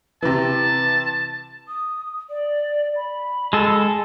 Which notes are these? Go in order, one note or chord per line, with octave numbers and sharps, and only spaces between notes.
C3 E3 A5
D#6
D5
B5
G#3 A4